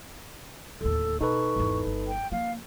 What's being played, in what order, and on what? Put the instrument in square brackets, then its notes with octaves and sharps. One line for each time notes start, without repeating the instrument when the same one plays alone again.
[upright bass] D1 D#2 [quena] A4
[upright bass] B2 [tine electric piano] D#4 A4 B4 [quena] C#6
[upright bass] G#1 E2
G1
[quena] G5
[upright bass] F3 A#3 [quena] F5